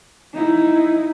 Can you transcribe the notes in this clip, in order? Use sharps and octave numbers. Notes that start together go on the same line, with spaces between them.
D#4 E4